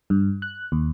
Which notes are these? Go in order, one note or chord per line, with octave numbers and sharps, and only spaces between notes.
G2
F#6
D#2